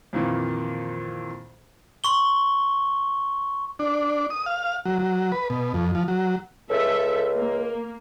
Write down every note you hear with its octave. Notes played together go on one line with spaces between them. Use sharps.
F2 A#2 D#3 E3 A#3
C6 C#6 G7
D4
D#6
F5
F#3
F#3
B4
B2
F2
F3
F#3
C#2 A4 E5
A#3